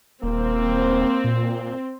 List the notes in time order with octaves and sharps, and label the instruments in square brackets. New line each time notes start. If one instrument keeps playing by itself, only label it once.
[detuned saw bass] D#1 [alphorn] A#3 [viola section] C4
[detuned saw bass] A#2